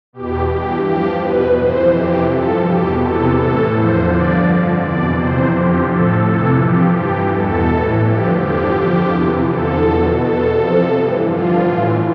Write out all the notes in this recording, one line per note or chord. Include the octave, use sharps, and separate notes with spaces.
E2 B2 G4
G2 E3 G4
G2 F3 G4
E2 B2 B4
F2 E3 C5
F2 C3 E3 G4
G2 F3 A4
E2 B2 G4
E2 C3 E3 A4
A2 E3 A4
E2 D3 F3 C5
G2 D3 F3 D5
F2 D3 F3
E2 B2 D5
F2 C3 E3 C5
F2 D3 F3 G4
A2 F3 A4
F2 C3 E3 A4
G2 F3 G4
G2 E3 G4
E2 B2 A4
A2 E3
G2 D3 F3 G4
E2 D3 F3 G4
F2 D3 F3
E2 C3 E3
E2 D3 F3 A4
E2 B2
E2 B2 A4
F2 C3 F3
G2 E3
G2 D3 F3 F4
A2 E3